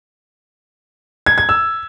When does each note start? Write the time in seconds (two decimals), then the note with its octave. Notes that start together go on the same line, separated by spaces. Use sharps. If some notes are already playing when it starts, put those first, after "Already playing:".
1.26 G#6
1.38 G#6
1.49 E6